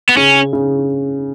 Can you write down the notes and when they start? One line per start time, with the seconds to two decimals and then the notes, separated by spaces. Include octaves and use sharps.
0.09 B3
0.17 C#3 C#4
0.53 C#3